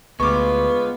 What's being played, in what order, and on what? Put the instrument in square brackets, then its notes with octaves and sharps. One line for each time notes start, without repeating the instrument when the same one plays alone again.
[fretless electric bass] D2 [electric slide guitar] G#3 F4 [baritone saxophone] B3 [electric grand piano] C#6 D6